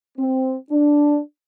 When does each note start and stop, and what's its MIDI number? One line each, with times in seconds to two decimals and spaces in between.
0.18 0.56 60
0.71 1.20 62